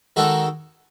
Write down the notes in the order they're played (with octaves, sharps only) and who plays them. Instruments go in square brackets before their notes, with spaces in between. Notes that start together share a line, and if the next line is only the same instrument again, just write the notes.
[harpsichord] D#3 G#3 D#4 F#4 A4